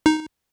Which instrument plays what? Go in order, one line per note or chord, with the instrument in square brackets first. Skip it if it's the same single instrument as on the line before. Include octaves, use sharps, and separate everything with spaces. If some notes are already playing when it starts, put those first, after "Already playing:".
[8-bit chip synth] D#4